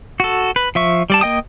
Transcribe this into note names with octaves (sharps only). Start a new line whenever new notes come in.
F#4 A4
B4
F3 E5 C#6
G3 D5 A5
A#3 D#5 G5 D#6